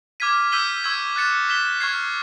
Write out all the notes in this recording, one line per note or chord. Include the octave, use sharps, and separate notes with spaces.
D6 F6 G#6 B6 D#7
E6 G6 B6 D#7 G7
C#6 E6 G#6
F#6 A6 C#7 E7
F#6 B6 E7 G7
C#6 F6 G#6 C7